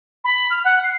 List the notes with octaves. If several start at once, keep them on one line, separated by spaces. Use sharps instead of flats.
B5
F6
F#5
C7